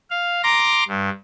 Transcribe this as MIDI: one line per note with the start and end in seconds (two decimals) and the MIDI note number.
0.10 0.42 77
0.43 0.83 82
0.43 0.83 84
0.43 0.83 86
0.43 0.83 94
0.88 1.10 43